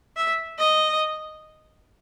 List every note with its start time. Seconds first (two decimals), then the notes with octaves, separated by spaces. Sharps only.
0.16 E5
0.58 D#5